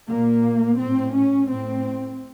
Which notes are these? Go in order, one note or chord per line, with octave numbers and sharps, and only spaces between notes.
A#2 A#3
A2 C4
C#4
A2 C4